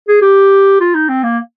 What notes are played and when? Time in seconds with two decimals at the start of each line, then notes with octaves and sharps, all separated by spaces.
0.08 G#4
0.22 G4
0.80 F4
0.95 D#4
1.09 C4
1.23 A#3